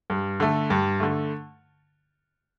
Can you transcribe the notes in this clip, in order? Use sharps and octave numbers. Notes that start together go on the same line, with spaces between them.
G2
D3 A3
G2
D3 A3